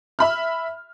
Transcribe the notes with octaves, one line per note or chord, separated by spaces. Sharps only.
E5 B5 F6